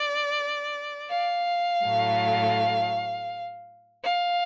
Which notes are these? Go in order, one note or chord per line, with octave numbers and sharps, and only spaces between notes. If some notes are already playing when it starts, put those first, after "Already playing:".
Already playing: D5
F5
A2 F#3 A3
F5